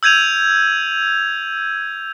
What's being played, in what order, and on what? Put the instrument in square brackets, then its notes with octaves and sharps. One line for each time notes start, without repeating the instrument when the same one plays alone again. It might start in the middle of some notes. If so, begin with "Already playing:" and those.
[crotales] E6 G6 G#6 D#7 F7